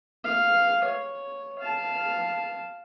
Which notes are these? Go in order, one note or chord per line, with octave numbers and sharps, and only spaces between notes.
F5
C#5
F5 A5